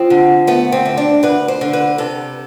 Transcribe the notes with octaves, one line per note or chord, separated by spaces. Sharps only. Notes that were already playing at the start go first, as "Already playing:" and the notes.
Already playing: F3 C4
D3
A3 B3
C4
D2
D4
D2 B4
C5
D3
B4
C3 A4